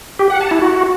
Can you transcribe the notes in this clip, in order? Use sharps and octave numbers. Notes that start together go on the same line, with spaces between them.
G4
F#5
A5
E4
F#4